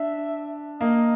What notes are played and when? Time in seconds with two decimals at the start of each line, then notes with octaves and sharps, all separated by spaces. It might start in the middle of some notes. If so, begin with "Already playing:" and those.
Already playing: D4 E5
0.81 A#3 D#5